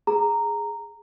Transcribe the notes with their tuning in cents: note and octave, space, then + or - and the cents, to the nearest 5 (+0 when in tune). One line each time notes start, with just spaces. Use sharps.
G#4 +0 A#5 -10